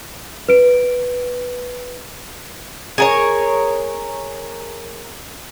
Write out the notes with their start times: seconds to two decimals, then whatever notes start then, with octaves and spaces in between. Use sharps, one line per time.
0.49 B4 D7
2.98 G#4 A#4 C#5